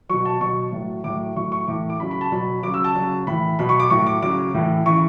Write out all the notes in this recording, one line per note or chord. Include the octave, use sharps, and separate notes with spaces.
B2 F#3 C#6
A5
B2 F#3 C#6
A2 F#3
A2 F#3 D6
A2 F#3 C#6
C#6
A2 E3 D6
D6
C#3 F#3 B5
B5
A5
B2 F#3 B5
C#3 F#3 D6
E6
A5
C#3 F#3
A2 E3 B5
B2 F#3 B5
C#6
D6
A2 F#3 C#6
D6
C#3 F#3 D6
A2 E3
C#3 E3 C#6